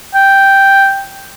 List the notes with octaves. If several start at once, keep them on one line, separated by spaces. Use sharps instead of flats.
G5